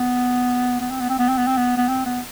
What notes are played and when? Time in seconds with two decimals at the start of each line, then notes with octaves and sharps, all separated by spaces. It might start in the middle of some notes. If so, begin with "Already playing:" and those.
Already playing: B3
0.80 B3
0.90 C4
1.00 B3
1.09 C4
1.19 B3
1.28 C4
1.38 B3
1.47 C4
1.57 B3
1.78 B3
1.88 C4
2.06 B3